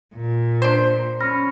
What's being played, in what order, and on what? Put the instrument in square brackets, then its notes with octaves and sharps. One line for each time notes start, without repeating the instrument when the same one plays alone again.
[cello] A#2
[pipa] D4 C5
[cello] C#4 [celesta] B5 F6 A#6